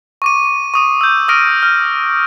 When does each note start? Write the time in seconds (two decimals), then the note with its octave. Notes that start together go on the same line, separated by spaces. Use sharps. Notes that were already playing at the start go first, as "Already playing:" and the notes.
0.22 C#6 D6 D#7
0.74 C#6 D#6 D#7
1.01 E6 G6
1.28 C#6 D#6 F6 A#6 D7 D#7
1.63 F6